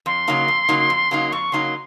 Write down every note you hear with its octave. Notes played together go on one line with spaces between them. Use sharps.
F2 C6
C#3 F#3 A#3 D#4
F2
C#3 F#3 A#3 D#4
F2
C#3 F#3 A#3 D#4
F2 C#6
C#3 F#3 A#3 D#4 C6